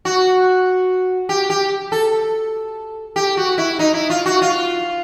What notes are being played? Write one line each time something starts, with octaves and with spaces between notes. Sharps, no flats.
F#4
G4
G4
A4
G4
F#4
E4
D#4
E4
F4
F#4
F4